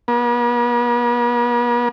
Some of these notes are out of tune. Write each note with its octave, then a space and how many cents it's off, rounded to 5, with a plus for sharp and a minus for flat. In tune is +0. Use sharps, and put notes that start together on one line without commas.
B3 -45